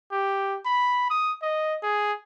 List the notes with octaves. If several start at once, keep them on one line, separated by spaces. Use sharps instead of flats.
G4
B5
D#6
D#5
G#4